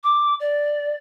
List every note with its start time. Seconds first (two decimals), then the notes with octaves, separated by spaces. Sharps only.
0.03 D6
0.40 D5